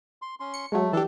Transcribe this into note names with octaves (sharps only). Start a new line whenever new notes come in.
C6
C#4 C6
C#7
F#3 G#3 A3
E3 D4 G4 A4 A5